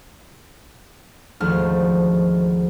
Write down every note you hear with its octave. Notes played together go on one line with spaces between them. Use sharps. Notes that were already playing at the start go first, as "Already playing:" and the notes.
G#1 D2 F3 F6